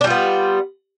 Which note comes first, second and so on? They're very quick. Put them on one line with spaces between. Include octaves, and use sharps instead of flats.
D4 G3 F4 B3